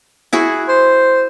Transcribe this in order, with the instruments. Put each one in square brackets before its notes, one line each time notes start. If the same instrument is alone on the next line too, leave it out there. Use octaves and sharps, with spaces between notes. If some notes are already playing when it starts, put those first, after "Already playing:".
[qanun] E4 F#4 G#4
[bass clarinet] C5